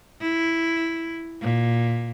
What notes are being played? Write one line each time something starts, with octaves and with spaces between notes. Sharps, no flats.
E4
A#2